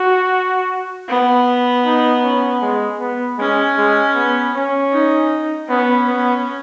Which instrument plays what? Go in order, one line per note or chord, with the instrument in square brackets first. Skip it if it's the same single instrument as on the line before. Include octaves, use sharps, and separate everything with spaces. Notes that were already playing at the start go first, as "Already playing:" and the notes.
Already playing: [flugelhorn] F#4
[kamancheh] B3
[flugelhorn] D#4
C#4
G#3
B3
[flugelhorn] G#3 [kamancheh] C#4
[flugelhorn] G#3
B3
C#4
[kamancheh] D#4
[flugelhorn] B3 [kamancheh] C#4
[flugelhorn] B3